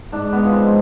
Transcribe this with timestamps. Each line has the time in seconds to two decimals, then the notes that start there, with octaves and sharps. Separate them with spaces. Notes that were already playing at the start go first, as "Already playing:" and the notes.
0.12 G#2 D4
0.33 B3
0.42 F3 G#3
0.53 C4